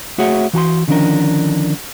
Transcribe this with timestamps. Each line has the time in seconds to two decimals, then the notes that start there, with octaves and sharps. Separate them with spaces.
0.18 A3 F#4 G#4 C#5 E5 F#5
0.53 E3 F#4 A5 C6
0.88 D3 D#3 F3 C#4 D4 A#4